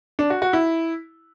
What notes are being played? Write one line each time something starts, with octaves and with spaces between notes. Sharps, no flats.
D4
F#4
F#4
E4